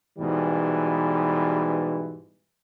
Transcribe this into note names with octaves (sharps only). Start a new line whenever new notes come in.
G#2 B2 E3 G3